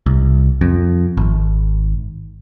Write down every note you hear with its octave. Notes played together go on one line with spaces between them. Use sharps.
C2
F2
G#1